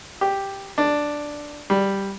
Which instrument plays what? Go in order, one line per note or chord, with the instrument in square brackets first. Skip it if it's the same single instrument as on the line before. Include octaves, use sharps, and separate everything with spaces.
[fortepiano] G4
D4
G3